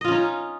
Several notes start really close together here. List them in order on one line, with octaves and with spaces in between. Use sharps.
D#5 F4 C#4 D#4